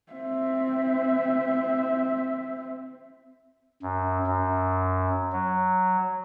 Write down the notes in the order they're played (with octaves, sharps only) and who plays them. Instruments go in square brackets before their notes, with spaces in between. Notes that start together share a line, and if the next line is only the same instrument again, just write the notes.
[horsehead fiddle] C4 E5
[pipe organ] F#2
F#2
F#3